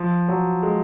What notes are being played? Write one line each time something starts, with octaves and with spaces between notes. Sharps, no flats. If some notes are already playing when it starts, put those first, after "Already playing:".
Already playing: F3
F#3
G#3